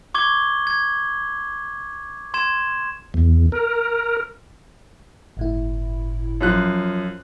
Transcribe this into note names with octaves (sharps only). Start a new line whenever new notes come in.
C#6 D6 G#6 G7
G#6
C6 G#6 E7
E2
A#4
G1 A2 E4
F#2 F3 F#6